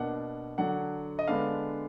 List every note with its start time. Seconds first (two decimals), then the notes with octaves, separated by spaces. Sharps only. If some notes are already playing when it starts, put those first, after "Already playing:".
Already playing: B2 A#3 D4 F#5
0.58 D3 F#3 D4 F#5
1.19 D#5
1.28 D3 G#3 B3 D4 F5